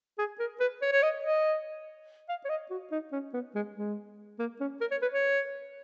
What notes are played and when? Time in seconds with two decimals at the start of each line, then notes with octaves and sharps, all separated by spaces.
0.18 G#4
0.39 A#4
0.60 B4
0.82 C#5
0.92 C#5
1.03 D#5
1.23 D#5
2.29 F5
2.45 C#5
2.49 D#5
2.70 F#4
2.91 D#4
3.12 C#4
3.33 B3
3.55 G#3
3.76 G#3
4.39 A#3
4.60 C#4
4.81 A#4
4.91 C#5
5.02 B4
5.13 C#5